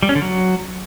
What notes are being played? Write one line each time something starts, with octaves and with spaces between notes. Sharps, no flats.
G3
C#4
D3
F#3